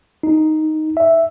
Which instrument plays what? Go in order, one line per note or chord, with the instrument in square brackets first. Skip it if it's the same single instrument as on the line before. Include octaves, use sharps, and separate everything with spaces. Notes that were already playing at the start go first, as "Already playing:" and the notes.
[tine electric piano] D#4
E5